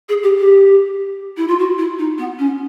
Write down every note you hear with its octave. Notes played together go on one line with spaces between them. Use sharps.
G#4
G4
G4
E4
F4
F#4
E4
D#4
B3
C#4